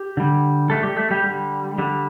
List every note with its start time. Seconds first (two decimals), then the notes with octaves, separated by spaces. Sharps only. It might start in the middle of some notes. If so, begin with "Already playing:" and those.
Already playing: G4
0.17 D3 G3
0.70 D3 G3 A3 A4
0.83 G3 G4
0.96 A3 A4
1.11 G3 G4
1.24 D3 G3
1.78 D3 G3